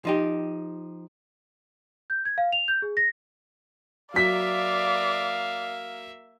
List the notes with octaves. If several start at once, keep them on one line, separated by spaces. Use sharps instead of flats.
F3 D#4 G4
G6
G#6
F5
F7
G6
G#4
A#6
F#3 A#3 D5 E5 F5 B6